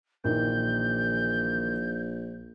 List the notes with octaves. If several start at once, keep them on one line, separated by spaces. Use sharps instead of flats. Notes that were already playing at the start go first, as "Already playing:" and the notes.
A#1 A#2 D#3 E3 G6